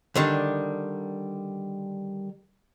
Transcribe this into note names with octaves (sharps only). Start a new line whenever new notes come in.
D3 D#3 G3 D4